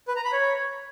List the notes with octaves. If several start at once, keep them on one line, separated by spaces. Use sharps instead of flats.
B4
A#5
B5
C#5